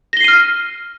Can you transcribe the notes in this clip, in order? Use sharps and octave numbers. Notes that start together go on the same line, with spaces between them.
F6 A#6 C7 D#7 G7